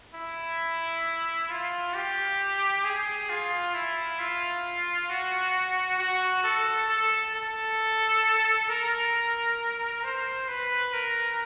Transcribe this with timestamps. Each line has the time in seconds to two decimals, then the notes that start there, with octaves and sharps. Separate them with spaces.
0.15 E4
1.50 F4
1.95 G4
2.84 G#4
3.29 F4
3.74 E4
4.19 F4
5.09 F#4
5.99 F#4
6.44 A4
6.89 A4
7.34 A4
8.69 A#4
10.04 C5
10.49 B4
10.94 A#4